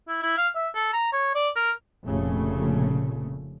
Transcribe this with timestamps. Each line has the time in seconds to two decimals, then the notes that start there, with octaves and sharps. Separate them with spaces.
0.08 E4
0.23 E4
0.37 F5
0.55 E5
0.75 A4
0.93 A#5
1.13 C#5
1.35 D5
1.56 A#4
2.06 F1 A#2 C#3 A3